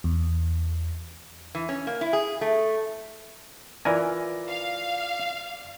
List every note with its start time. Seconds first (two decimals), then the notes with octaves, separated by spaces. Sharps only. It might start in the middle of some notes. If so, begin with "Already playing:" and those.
0.04 E2
1.55 E3
1.69 C#4
1.87 A#3
2.01 E4
2.13 G#4
2.41 A3
3.85 E3 F4 A#4 D5 G#5 A#6
4.47 F5